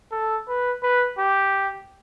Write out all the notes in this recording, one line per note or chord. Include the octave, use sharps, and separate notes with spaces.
A4
B4
B4
G4